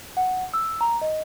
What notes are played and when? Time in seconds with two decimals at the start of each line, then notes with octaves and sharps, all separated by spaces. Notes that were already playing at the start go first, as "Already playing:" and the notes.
0.17 F#5
0.54 E6
0.81 A#5
1.01 D#5